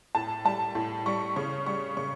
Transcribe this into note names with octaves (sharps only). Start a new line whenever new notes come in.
A2 A5
G3 A5
A2
G3 C#6
C#3 C#6
G3 C#6
C#3 C#6